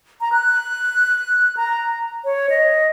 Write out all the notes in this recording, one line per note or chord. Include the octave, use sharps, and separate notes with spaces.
A#5
F#6
A#5
C#5
D#5